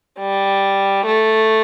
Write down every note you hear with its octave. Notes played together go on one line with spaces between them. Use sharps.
G3
A3